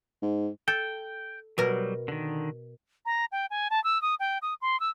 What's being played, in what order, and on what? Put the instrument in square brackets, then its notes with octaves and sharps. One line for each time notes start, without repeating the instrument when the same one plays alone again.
[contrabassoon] G#2
[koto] A4 [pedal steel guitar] G5
[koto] B2 A#4 [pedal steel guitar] F#3 G3
[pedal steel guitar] D3 D#3
[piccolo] A#5
G5
G#5
A5
E6
D#6
G5
D#6
C6
E6